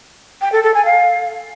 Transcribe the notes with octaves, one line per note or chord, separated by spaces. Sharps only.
G5
A4
A4
G#5
F5